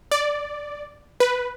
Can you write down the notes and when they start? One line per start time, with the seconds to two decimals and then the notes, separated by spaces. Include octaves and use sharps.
0.11 D5
1.20 B4